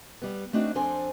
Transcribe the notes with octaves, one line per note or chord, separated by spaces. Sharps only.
G3 B3
A3 C4 D4 D#4 F#4
F2 C4 D4 A4 C5 G#5